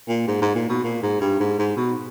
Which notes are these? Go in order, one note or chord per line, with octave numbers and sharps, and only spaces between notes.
A#2
G#2
G#2
A#2
B2
A#2
G#2
G2
G#2
G#2
B2